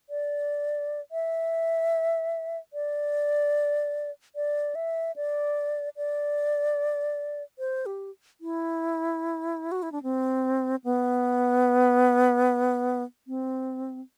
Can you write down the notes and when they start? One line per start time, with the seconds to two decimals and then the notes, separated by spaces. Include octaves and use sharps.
0.10 D5
1.12 E5
2.73 D5
4.36 D5
4.75 E5
5.16 D5
5.97 D5
7.59 C5
7.86 G4
8.41 E4
9.72 F#4
9.82 E4
9.92 D4
10.03 C4
10.84 B3
13.27 C4